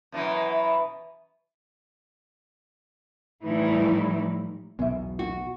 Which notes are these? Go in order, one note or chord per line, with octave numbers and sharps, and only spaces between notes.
F#2 B2 E3
A2 E3 F3 G3 D#4 E4
B1 E2 B2 B3 E5
F#4